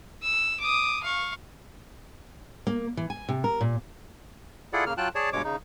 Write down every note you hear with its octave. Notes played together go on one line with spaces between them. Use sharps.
E6
D6 D#6
F5 C#6
A#3
E3
G#5
C3
A#4
A#2
E4 F4 G#4 A4 D5 F#5
C#3 A#3 F6
F#3 F4 G5 A5 F#6
G#4 C#5 D5 A5
G2 B2 G#3 C#5 D6
C#3 D#4